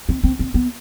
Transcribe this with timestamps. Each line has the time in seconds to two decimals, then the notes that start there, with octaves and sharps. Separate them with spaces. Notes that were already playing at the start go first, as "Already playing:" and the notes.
0.09 C4
0.24 C4
0.39 C4
0.54 B3